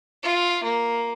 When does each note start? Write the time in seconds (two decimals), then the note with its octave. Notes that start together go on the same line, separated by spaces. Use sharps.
0.23 F4
0.63 A#3